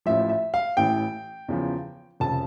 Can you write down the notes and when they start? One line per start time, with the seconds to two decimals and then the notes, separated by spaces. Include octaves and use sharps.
0.06 A1 A2 F3 E5
0.29 E5
0.54 F5
0.77 A1 A2 E3 G5
1.48 E2 C#3 F3
2.20 F1 F2 C#3 A5